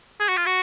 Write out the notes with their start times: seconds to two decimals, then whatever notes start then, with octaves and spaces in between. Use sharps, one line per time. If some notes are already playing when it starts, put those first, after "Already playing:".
0.20 G#4
0.29 F#4
0.37 F4
0.46 F#4